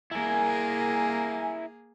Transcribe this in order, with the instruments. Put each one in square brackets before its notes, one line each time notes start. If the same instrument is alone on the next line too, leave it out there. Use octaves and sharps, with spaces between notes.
[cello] A#3 G#4 [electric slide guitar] E4 A#4 [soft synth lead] G#5